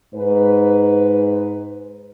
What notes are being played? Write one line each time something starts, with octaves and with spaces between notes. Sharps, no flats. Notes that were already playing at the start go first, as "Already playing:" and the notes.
G#2 B4